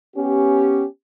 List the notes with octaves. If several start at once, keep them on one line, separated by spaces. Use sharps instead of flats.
B3 C#4 G4